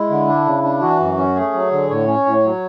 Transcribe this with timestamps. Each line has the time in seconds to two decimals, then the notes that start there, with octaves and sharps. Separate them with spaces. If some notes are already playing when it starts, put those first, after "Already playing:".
Already playing: G#3 E4
0.10 D3
0.28 D4
0.46 C#3
0.63 D4
0.81 E3 F#4
0.99 F#2
1.18 C#4
1.35 A3 G#4
1.53 F#3
1.72 D3
1.89 A2 C#5
2.07 C#4
2.26 A2
2.44 F#3